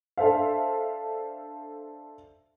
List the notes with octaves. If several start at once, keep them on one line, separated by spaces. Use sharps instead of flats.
D4 A4 C5 E5 F5